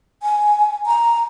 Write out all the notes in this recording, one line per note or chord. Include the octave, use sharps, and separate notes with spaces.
G#5
A#5